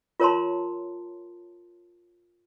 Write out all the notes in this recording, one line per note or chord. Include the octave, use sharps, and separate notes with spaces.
F4 A#4 C#5 A5 A#5 C6